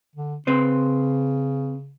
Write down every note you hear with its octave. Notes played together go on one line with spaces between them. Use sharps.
D3
C#3 C4 B4 C5